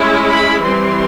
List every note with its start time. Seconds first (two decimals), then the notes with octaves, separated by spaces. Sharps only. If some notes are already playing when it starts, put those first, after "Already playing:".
Already playing: G#3 C#4 E4
0.28 B5
0.63 E3 G3 C4 C6